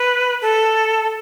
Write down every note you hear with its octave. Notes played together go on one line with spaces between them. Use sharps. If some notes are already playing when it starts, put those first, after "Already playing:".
Already playing: B4
A4